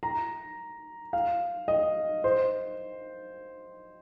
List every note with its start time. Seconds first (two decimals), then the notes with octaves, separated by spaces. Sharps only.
0.03 A#5
1.13 F5
1.68 D#5
2.24 C5